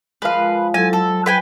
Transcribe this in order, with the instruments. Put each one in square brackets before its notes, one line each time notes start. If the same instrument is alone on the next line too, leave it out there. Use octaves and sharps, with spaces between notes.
[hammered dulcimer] F3 G#3 [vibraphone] A#4 [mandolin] B4 F5
[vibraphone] F#3 E4 A4 [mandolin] G#5
[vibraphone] F#3 [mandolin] A4
[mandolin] B4 G5 G#5